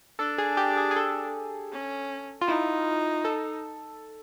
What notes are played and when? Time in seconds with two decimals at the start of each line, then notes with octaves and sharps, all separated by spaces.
0.19 D4 A4
0.38 G#4
0.57 G4
0.77 G#4
0.91 G#4
0.96 A4
1.72 C#4
2.41 F4
2.48 D#4 E4
3.25 A4